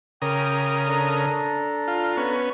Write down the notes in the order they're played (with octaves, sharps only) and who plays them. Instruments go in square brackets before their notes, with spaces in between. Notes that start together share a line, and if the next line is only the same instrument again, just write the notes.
[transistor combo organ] C#3 A#4 D#6 [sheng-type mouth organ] G5 D6 G6
[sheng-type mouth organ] D4 A4 A#5
[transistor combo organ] F4
B3 C#4